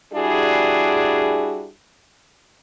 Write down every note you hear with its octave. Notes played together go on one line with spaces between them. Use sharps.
G3 D4 E4 F#4 G#4